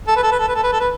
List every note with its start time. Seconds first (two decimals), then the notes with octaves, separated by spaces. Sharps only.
0.08 A4
0.16 B4
0.23 A4
0.32 B4
0.40 A4
0.48 B4
0.56 A4
0.63 B4
0.73 A4
0.80 B4